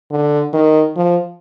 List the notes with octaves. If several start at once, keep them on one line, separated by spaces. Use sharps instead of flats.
D3
D#3
F3